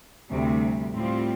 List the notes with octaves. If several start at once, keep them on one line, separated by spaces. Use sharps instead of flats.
D2 C3 G3
A2 G3 C4 F4